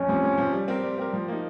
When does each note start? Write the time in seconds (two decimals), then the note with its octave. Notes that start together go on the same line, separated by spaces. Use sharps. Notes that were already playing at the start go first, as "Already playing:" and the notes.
Already playing: F2 C#4
0.09 C3 F3
0.23 F2
0.38 C3 F3
0.53 G3
0.68 C4 G4 A#4
0.83 G3
0.98 C4 G4 A#4
1.13 F3
1.28 A#3 D#4